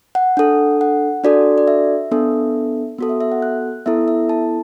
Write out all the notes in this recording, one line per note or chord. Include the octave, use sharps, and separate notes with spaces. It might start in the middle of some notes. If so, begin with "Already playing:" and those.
F#5
D4 A4
F#5
D4 F#4 A4 D5
D5
E5
B3 D4 A4
B3 F#4 A4
E5
E5
F#5
F#6
B3 E4 A4 E5
E5
A5